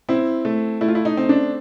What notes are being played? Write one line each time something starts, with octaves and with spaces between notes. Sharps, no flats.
C4 E4
A3
A3 E4
F4
E4
D#4
C4
D4